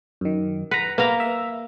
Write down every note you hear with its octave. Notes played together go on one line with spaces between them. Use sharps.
F#2 D#3
B4 F#5 A#5
A#3 B3 F5 A#5
E5